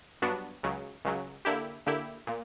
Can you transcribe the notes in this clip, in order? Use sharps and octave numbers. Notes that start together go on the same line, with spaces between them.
G2 F#3 B3 D4 F#4
C#2 C#3 F#3
C#2 C#3 F#3
D3 A#3 E4 G4
D3 A#3 E4 G4
A#2 A#3